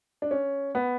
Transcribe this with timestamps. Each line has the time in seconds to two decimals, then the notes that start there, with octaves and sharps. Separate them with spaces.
0.22 D4
0.31 C#4
0.75 B3